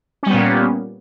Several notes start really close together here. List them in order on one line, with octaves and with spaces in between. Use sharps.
C#4 G3 B3 A#2 A#3